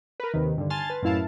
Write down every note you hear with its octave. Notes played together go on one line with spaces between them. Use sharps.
A#4 B4
D#2 C3 D#3
G2 D3
G#5 A5 C6 F6 A6
B4
F#2 A2 E4 F5 A5